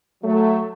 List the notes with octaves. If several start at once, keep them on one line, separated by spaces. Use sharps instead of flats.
F#3 A3